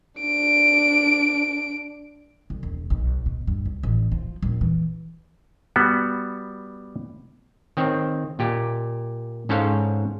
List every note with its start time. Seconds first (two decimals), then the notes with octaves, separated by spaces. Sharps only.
0.21 D4 D7
2.50 C2
2.63 E1
2.90 B1
3.26 B2
3.47 G2
3.65 C2
3.83 A1
4.12 F3
4.42 A#1
4.61 E3
5.76 G3 B3 F#4
7.77 D#3 C4 C#5
8.39 A#2 G4
9.49 G#2 C#4 A4 C5 C#5 F5